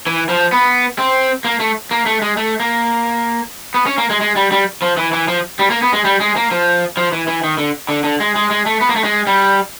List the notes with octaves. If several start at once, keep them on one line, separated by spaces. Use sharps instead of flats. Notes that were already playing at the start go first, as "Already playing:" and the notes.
E3
F3
B3
C4
A#3
A3
A#3
A3
G#3
A3
A#3
B3
C#4
A#3
G#3
G#3
G3
G3
F3
E3
E3
F3
G3
A#3
B3
G#3
G3
G#3
A#3
F3
F3
E3
E3
D#3
D3
D3
D3
G#3
G#3
G#3
A3
B3
A#3
A3
G#3
G3